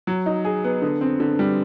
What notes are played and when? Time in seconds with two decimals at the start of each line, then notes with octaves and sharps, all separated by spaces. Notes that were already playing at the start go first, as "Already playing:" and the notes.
0.07 F#3
0.26 D#4
0.45 G#4
0.64 B3
0.82 D3
1.01 C4
1.20 D3
1.39 G3